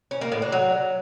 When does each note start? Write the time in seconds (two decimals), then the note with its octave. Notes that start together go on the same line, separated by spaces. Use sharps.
0.11 C#4
0.21 A#3
0.32 A2
0.42 D4
0.52 F#3